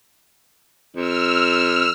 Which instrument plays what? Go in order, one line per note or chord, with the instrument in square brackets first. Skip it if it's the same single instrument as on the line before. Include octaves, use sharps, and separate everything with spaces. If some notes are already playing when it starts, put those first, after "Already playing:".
[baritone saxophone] F2 [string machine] E6 F6